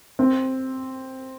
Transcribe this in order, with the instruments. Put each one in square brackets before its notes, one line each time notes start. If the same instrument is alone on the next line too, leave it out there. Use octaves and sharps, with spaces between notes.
[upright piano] C4